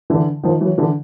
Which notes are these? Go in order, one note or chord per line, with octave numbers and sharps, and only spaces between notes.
D3 E3
D#3 F3
E3 F#3
D3 E3